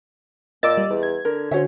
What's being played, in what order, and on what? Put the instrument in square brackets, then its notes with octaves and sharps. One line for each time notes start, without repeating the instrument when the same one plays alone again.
[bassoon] A#2 [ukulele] D#5 [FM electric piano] D6 E6 A6
[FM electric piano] G3
[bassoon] E2
[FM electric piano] G#6
[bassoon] D3 [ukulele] A#4
[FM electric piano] D3 F#4 [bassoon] C#4 [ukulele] C5 C#5 E5